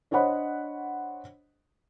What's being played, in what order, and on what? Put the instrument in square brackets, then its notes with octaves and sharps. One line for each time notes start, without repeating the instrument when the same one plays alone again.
[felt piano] D4 C5 C#5 D#5 F#5 B5